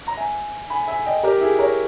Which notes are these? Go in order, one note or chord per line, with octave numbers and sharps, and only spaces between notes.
A#5
E5 G#5
G#5 B5
E5 G#5
D#5 G5
G4 A#4
E4 G#4
A#4 C#5